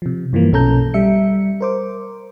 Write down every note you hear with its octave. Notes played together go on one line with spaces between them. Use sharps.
C3 F3
G2 E3 F3 A#3
B1 B2 C#4 A4 A#5 G6
G3 E5 C#7
A#4 C5 D6